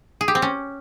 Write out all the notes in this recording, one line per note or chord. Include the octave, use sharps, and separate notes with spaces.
G#4
G4
C4
C#4